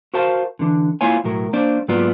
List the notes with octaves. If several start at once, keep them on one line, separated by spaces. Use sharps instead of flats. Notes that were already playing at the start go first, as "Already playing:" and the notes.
F#4 A#4 C5 F5 A5
D3 E3 D4
A#3 E4 F4 C#5 G#5
B1 A2 F#3 A#4
A#3 D4 C5 D5
G#2 F#3 A#3 B3 F4 D5